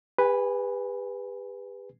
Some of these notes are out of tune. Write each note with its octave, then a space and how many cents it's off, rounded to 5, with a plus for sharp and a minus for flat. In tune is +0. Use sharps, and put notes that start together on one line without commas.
G4 +40 B4 +0 G#5 -10